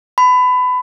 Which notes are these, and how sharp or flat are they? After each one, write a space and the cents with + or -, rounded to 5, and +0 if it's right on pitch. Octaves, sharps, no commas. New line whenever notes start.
B5 +25